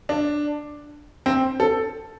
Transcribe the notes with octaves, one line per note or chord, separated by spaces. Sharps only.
D4
C4
A4